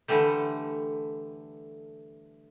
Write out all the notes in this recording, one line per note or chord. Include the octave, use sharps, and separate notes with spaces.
D3 E3 G3 A3